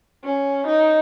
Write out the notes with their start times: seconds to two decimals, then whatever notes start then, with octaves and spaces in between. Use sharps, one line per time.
0.24 C#4
0.67 D#4